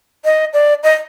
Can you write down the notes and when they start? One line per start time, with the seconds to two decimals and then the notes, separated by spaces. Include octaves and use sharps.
0.25 D#5
0.53 D5
0.83 D#5